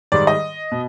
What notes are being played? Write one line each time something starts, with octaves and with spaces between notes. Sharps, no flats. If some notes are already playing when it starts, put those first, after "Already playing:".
G#2 D#3 G3 D5
D#5
B2